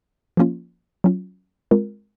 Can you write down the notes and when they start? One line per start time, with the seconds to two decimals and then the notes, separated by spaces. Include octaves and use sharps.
0.37 F3 A#3 C#4 F4
1.04 F#3 C#4 F4
1.71 G#3 C4 F4 A#4